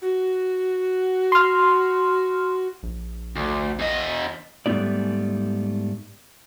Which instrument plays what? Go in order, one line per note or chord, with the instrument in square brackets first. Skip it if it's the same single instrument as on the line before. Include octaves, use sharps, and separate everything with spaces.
[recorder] F#4
[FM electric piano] C6 F6
[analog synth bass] A#1
[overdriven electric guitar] D2
E2 D#5
[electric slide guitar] G#2 G3 A3 B3 E4 D5